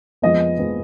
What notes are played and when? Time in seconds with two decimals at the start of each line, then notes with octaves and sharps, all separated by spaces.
0.22 F2 F3 G#3 B3 D#5
0.59 F3 G#3 B3